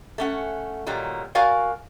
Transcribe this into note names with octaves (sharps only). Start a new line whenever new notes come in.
A3 C#4 F#5
A#2 D#3 F#3 G3
F#4 A#4 D5 F5 G#5